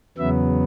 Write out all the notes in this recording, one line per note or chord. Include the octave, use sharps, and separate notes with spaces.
E2 C#3 F#3 B3 E5